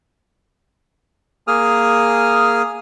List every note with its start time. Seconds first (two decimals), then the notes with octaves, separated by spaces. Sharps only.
1.48 A#3 G#4 D#6 F6